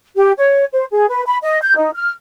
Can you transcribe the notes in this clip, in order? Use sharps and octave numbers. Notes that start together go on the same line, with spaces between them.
G4
C#5
C5
G#4
B4
B5
D#5
G6
D#4
F6